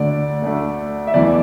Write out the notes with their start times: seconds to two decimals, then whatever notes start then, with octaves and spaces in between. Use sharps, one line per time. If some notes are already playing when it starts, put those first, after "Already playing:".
Already playing: D2 D3 A3 D5
0.42 D2 D3 A3
1.07 E5
1.14 E2 E3 A3 D5